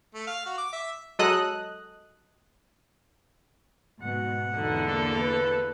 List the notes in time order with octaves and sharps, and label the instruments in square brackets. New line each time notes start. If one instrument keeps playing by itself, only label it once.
[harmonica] A3
F5
F#4
D6
E5
[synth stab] F#3 G#3 A4 D#5 D#6 F#6
[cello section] G#2 B2 [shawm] F#5
[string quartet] E2 D3 [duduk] D#4
[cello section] A#3 [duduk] D4 [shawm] A4
[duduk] B4